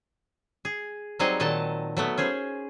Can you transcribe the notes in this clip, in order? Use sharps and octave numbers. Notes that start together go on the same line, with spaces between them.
G#4
F#3 G3 C4 D#4 G#4 D#5
A#2 D#3 F#3 D#5 A5
F#3 A3 B3
C#4 G#4 C5